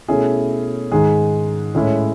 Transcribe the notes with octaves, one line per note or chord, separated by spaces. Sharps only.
B2 A3 C#4 E4 G#4
G#2 D#3 G#3 G#4
A2 G#3 C#4 E4